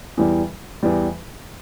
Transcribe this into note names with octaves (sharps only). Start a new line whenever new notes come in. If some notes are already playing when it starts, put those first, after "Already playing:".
E2 E3 G3
E2 E3 G3